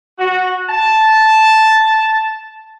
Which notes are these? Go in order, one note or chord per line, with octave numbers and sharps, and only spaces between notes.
F#4
A5